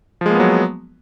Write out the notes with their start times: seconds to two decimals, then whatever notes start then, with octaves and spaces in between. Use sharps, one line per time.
0.21 F3
0.26 G#3
0.30 A#3
0.35 B3
0.40 F#3